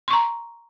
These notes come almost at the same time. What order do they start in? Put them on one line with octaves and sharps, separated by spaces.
C6 C#6 A#5